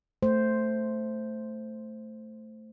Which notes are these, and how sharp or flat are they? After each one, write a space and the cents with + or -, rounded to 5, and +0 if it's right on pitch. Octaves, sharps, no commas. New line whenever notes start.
A3 +5 C5 +0